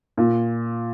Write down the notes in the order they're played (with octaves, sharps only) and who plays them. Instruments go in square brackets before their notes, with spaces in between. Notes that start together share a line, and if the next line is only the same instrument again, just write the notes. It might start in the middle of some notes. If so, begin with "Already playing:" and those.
[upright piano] A#2